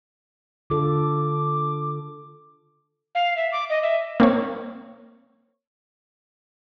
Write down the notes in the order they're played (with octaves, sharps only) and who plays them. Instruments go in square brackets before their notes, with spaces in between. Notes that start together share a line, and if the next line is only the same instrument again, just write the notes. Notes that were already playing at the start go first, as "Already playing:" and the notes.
[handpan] D3 F4 A4 [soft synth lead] D6
[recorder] F5
E5
D6
D#5
E5
[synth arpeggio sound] A#3 C4 C#5